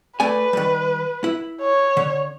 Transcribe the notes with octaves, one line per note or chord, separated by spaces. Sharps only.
A3 B4 D5 G#5
D#3 G3
E4
C#5
D3